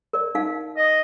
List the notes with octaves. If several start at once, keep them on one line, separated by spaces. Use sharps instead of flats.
A#4 D5
D#4 F5
D#5